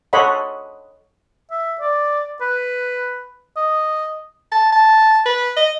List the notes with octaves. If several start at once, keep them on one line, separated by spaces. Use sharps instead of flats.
A4 C#5 D#5 F#5 B5 C6
E5
D5
B4
D#5
A5
A5
B4
D#5